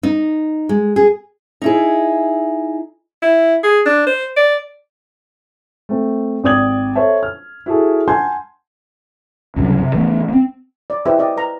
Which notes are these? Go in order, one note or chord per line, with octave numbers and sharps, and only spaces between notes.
D#4
G#3
G#4
D#4 E4 G#4
E4
G#4
D4
C5
D5
A3 C4
G#1 G4 D5 D#6 G#6 F#7
A4 C5 C#5 E5 A5
F6
E4 F#4 G#4 A4
F#5 G#5 A5 C6 G6 G#6
C#2 G2 C3 F#3
C3
E3 A3 B3
A#3 C4
D5
E4 G4 B4 C5 D#5 E5
G4 D5 D#5
A#4 B4 A#5